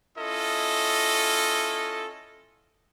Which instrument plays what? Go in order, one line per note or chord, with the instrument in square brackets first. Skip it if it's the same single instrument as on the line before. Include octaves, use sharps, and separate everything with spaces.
[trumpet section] C#4 E4 F4 A4 D#5